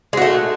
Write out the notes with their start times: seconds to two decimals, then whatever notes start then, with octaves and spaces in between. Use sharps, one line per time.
0.13 G#3
0.17 F#4
0.22 A3